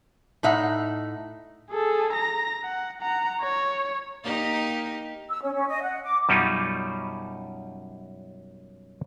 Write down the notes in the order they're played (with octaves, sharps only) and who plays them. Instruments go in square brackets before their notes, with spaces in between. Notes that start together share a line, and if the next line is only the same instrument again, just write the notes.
[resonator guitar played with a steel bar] A2 D#4 E5 F#5
[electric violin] G#4 A4
A#5 A#6
F#5
F#5 A#5
C#5
[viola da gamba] A#3 D#4 G4
[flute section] E6
C#4
C#4
D#5
F#5
D6
[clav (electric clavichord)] F#2 B2 G3 C#4 D#4 F4